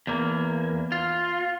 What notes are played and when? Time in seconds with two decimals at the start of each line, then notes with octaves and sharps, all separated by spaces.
0.07 E2 A#3
0.92 F4